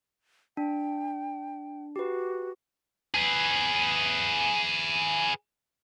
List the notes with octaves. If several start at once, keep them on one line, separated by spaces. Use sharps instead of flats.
D4 G5
F#4 G4 B4
G#4 B4